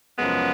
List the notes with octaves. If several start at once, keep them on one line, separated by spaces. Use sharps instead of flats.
F#2 C#3 F3 G#3 B3